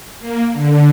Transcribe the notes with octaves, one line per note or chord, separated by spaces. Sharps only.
A#3
D3